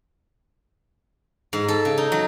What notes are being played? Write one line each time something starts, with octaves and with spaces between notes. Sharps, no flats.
G#2
A4
C#3
D#4
F#3